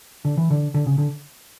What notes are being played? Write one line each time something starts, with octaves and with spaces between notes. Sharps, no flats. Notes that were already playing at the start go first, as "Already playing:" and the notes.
D3
E3
D3
D3
C#3
D3